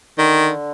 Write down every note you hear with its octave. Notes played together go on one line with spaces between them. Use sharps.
D3 D#3